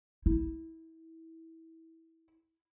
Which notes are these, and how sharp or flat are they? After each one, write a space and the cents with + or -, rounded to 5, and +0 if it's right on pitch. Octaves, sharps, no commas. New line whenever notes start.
E4 -20